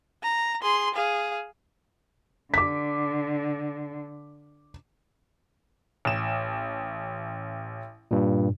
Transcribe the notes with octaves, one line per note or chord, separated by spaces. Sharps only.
A#5
G#4 C6
G#4 F5
D3 D6 B6
A1 E7
G2 A#2